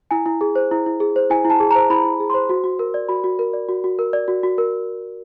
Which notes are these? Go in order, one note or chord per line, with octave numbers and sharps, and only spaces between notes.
E4 G#5
E4
G#4
C5
E4
E4
G#4
C5
E4 G#5
E4
A5
G#4
C5 A#5
E4 B5
E4
G#4
C5 C6
F#4
F#4
A#4
D5
F#4 B5
F#4
A#4
D5
F#4
F#4
A#4
D5
F#4
F#4
A#4